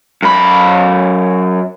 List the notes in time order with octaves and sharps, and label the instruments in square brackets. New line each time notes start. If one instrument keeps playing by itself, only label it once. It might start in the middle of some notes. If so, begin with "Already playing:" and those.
[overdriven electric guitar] F#2 B5